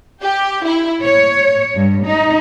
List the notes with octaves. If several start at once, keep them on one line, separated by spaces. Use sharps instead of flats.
G4
E4
C#5
G2
D#4